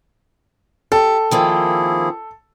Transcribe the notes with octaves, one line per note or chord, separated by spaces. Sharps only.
G4 A4
D#3 F3 A#3 C4 E4 G#4